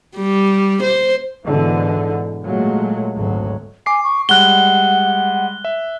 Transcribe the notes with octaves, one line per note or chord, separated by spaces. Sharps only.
G3
C5
G#2 B2 D3 E3
A#2 F#3 G#3 A3
G#1 D2 F#3
G#5 D6 C7
C#6
G3 G#3 F#5 F#6 G7
E5